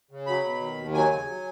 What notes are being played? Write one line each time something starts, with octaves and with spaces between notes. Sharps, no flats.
C#3
F#3 B5
B2
D#3
D#2
F#3 G#5
C#3
F#3